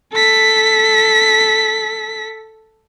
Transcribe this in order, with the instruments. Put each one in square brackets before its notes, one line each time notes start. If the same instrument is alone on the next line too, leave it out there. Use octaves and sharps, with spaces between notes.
[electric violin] A4 B6